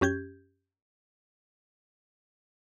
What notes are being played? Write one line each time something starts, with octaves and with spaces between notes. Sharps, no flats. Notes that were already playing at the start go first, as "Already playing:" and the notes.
F#2 C#4 G4 G6 G#6